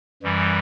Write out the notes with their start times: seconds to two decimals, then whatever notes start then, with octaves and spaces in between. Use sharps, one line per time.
0.23 F#2 E3 G3